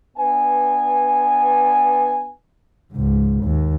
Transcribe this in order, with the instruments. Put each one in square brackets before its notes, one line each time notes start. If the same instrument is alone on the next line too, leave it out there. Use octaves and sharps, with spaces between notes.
[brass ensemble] B3 D4 B4 G#5
[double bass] C#2 G#2
D#2